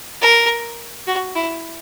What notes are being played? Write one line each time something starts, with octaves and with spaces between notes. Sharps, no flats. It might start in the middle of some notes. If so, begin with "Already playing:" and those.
A#4
F#4
E4